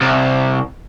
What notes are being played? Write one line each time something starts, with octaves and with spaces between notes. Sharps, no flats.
C2